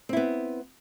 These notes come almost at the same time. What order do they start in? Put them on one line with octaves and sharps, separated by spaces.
C4 E4 B3